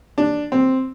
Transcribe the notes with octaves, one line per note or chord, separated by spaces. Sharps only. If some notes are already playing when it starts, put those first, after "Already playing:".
D4
C4